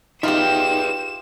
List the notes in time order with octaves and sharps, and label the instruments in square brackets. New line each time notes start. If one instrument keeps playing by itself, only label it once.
[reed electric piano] D#4 [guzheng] F4 G4 [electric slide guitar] G#4 B4 E5 [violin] E7